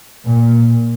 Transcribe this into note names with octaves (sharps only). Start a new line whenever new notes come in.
A#2